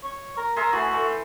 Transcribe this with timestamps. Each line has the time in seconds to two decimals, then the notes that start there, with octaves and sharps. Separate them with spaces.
0.03 C#5
0.37 A#4
0.56 G#4 A#4 C5 E5
0.73 E3 A3 F#4
0.93 A3